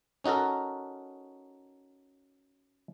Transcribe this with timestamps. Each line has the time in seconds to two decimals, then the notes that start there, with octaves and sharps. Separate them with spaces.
0.24 C#4 D#4 F#4 A4 A#4